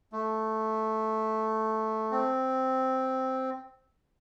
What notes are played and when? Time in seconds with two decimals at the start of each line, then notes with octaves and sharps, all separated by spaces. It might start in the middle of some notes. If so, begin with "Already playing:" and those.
0.13 A3
2.11 C4